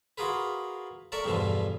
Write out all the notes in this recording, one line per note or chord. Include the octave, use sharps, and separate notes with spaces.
F4 F#4 G#4 A#4 B4
A4 A#4 D5 E5 C#6
E2 G2 B2 D3 E3 F3